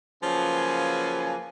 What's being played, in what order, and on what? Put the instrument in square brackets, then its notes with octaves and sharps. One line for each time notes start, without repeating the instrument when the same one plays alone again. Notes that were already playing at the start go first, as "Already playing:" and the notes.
[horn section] C#3 F3 F#3 A#3 B4 G#5